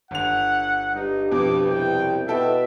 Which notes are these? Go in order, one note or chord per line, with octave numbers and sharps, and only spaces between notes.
G1 F#5 F7
G2 D#4
F2 B2 D6
C2 G5
B2 E4 A4 E5 G5